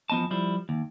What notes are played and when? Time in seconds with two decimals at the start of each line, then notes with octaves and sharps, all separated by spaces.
0.10 E2 F3 B3 D#5 A5
0.31 F3 G3 E4
0.69 D#2